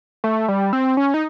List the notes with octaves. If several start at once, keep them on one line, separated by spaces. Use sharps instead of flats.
A3
G3
C4
C#4
D#4